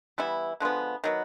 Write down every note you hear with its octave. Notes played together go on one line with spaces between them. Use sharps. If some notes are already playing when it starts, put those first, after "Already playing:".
E3 G3 B3 E4
D3 F3 G#3 B3
D#3 F#3 B3